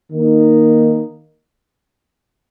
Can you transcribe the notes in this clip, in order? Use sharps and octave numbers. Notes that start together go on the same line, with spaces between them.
D#3 A#3 D#4